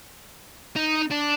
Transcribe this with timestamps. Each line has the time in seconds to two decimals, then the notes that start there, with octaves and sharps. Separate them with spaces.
0.76 D#4
1.10 D4